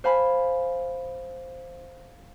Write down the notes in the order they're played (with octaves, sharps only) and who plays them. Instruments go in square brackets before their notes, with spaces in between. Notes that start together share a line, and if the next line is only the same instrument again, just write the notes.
[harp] C5 F5 G#5 B5